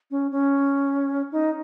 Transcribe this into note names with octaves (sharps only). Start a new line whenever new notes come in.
C#4
C#4
D#4